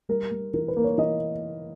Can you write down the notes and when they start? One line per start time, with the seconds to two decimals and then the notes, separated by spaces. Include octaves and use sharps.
0.09 G3 A#4
0.31 G3
0.54 E3 A#4
0.68 B4
0.76 A#3
0.84 C#5
0.98 E3 D#5